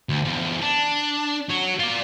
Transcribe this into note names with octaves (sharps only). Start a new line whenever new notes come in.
D2
E2 F3
D4
F#4 C#5
F4 D5